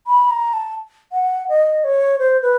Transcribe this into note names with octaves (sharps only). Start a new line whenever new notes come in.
B5
A#5
A5
F#5
D#5
C#5
C5
B4